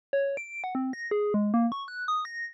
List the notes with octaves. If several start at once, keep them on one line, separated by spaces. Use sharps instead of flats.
C#5
D7
F#5
C4
A#6
G#4
G#3
A#3
C#6
F#6
D#6
A#6